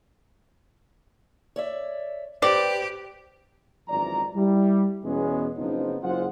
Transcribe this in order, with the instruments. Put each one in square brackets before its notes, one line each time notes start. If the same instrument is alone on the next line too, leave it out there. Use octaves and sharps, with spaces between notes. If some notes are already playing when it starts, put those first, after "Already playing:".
[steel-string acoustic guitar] C#5 D5 E5
[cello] G4 [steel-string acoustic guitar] B4 C5 G5 [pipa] D5
[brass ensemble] G#1 F#2 E3 F3 D5 A#5
G3 E4
E2 B2 G#3 B3 C#4
F#1 C#3 F3 B3 C4 D#4
F#1 F#3 F4 G#4 C5 F#5